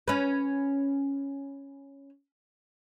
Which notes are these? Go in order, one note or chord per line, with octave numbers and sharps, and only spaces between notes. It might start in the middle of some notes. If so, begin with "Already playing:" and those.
C#4 B4